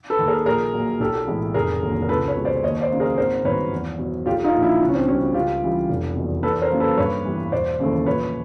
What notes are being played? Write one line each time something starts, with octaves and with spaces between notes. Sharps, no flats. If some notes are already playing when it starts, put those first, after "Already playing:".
A4 B4
D#2 D#3
G#4 A#4
A#1 G#4 A#4
A#2 F#3
B1 G4 A4
A2 E3 G#3 B3
F1 G#4 A#4
D#2 D3 F#3
A#4
C#2 A4 B4
B4 C#5
B2 G#3
C5 D5
D#2 C#5 D#5
C5 D5
C#3 F#3 A#3
G#4 A#4
G#1 A#4 C5
G2 D#3 F#3 B3 B4 C#5
E2
B2 F#3
B1 F4 G4
D#4 F4
A#2 F3
D4 E4
C#2 D4
C#4
C4 D4
B2 G3 C4 C#4
C#2 F4 G4
C#3 E3 G3
F1
E2 B2
E2 A4 B4
A#4 C5
C#3 F#3 A#3
A4 B4
G2 B4 C#5
E3 G3 B3
E1 C5 D5
D#2 C#3 E3 A3
A#1 B4 C#5